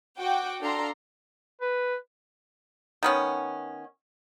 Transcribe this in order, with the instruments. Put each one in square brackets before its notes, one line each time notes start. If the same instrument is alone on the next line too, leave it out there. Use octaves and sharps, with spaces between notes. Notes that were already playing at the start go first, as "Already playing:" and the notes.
[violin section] F#4 F#5 G5 D6
D4 A4 F5 A#5 C6
[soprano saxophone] B4
[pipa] D#3 B3 C#4